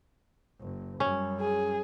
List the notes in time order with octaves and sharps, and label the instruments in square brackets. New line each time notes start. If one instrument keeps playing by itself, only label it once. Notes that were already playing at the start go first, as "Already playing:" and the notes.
[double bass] F#1
[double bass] F#2 G3 [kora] C#4
[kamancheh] G#4